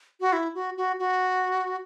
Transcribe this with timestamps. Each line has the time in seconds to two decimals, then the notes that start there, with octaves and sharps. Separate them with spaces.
0.20 F#4
0.33 E4
0.55 F#4
0.77 F#4
0.99 F#4